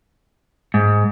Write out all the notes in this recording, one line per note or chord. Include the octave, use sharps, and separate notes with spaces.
G#2